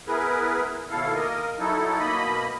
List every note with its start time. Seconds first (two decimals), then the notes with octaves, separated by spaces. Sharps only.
0.07 B3 E4 G#4 A#4 B4
0.90 D#2 B2 E4 A4 F5
1.15 A#3 A#4 D#5
1.59 F#3 D#4 E4 A4
1.99 B2 A#3 D#5 B5